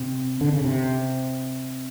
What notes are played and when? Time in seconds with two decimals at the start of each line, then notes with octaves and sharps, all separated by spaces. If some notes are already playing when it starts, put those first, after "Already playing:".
Already playing: C3
0.41 D3
0.53 C#3
0.64 C3